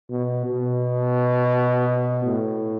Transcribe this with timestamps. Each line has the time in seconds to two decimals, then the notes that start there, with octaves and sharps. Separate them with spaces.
0.09 B2
0.45 B2
2.24 A2